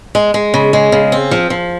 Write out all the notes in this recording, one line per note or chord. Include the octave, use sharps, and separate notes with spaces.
G#3
G#3
C#3
G#3
C#3
C4
F3
F3